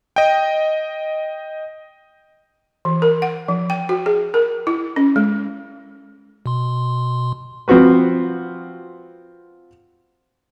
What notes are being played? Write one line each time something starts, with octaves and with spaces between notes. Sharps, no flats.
D#5 G5
E3
A#4
F#5
F3
G5
F#4
G#4
A#4
E4
C#4
G#3
B2 C6
F3 C4 F4 F#4 B4